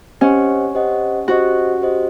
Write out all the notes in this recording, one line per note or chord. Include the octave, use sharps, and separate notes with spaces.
C#4 G4 C5 D#5 F#5
G4 C5 D#5 F#5
F#4 G4 C5 D#5
G4 C5 D#5